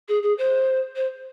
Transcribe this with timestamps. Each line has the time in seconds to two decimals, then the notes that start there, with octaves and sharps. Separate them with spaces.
0.09 G#4
0.23 G#4
0.38 C5
0.96 C5